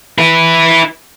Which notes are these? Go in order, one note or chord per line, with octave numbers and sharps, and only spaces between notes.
E4 B4